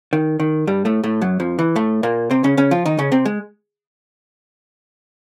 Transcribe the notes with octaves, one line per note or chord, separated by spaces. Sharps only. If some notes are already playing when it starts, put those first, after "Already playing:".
D#3
D#3
G2 G3
A2 A3
A2 A3
F#2 F#3
F2 F3
E3
A2 A3
A#2 A#3
C3 C4
C#3 C#4
C#3 C#4
F3 F4
D#3 D#4
C#3 C#4
C3 C4
G#3